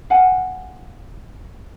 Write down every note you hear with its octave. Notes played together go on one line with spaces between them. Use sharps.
F5 F#5 G#5